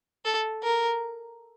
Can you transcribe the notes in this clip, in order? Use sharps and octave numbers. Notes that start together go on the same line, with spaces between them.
A4
A#4